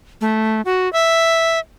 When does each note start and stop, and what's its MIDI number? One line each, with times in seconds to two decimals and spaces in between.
0.21 0.61 57
0.65 0.91 66
0.93 1.59 76